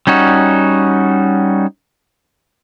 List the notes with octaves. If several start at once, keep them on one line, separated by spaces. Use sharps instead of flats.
G3 C#4 D#4 F#4